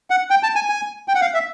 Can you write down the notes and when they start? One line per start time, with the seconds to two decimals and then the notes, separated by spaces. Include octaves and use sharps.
0.10 F#5
0.30 G5
0.43 A5
0.55 G#5
0.69 G#5
1.08 G5
1.15 F#5
1.21 F5
1.34 E5